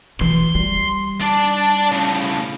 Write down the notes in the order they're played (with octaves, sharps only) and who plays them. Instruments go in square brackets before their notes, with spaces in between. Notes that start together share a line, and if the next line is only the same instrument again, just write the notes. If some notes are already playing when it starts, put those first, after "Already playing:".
[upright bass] E3 F#3 [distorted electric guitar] C6
[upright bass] G3
[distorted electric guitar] D4 D5 [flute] A5
[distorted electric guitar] A2 C#3